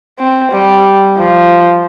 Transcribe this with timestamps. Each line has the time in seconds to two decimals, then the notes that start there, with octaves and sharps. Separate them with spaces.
0.19 C4
0.51 G3
1.17 F3